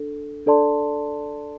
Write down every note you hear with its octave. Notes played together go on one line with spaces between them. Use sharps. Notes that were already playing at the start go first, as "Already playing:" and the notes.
Already playing: D4 A4
D4 A4 D5 A5 C6